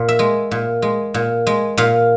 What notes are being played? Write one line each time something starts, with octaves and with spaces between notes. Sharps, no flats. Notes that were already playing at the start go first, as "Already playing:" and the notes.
Already playing: A#2
E5
G#3
A#2
G#3
A#2
G#3
A#2 F5